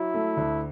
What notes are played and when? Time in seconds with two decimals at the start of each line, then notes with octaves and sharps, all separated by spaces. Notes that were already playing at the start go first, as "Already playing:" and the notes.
Already playing: F#3 E4
0.14 A3
0.37 D2